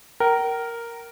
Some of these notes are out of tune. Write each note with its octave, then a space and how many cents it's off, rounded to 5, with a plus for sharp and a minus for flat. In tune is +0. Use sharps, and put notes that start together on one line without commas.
A#4 +0 G5 -40